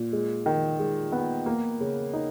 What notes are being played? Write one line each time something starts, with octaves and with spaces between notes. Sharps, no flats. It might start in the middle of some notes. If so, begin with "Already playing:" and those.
Already playing: A#2
G#3
D#3
G#3
B3
A#3
C#3
D#4